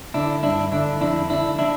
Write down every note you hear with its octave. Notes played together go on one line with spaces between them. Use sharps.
D3 D4 E4
G2 D4 E4
D3 D4 E4
F2 D4 E4
D3 D4 E4
D4 E4